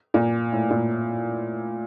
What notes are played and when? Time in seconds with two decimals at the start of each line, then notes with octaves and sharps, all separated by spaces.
0.14 A#2
0.52 A2
0.70 A#2